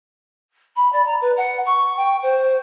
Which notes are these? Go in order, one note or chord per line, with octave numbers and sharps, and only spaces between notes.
B5
D5
A#5
B4
F#5
C#6
G5
C5